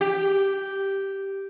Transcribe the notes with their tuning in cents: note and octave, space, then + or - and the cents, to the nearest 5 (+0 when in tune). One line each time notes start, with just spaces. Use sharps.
G4 -5